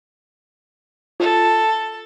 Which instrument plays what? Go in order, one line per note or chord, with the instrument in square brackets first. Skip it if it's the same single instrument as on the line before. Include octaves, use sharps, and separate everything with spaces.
[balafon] F4 [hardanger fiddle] A4